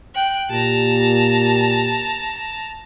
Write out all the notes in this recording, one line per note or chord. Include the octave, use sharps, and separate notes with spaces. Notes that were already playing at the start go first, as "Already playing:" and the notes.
G5 F#6
A#2 G4 A5 A#5